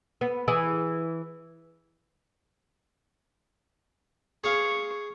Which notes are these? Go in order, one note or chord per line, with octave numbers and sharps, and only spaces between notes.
B3
E3 G#4
G#4 C#5 F5 C#6